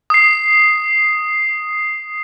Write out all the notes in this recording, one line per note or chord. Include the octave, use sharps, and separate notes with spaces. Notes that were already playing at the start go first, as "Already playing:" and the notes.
D#6 C7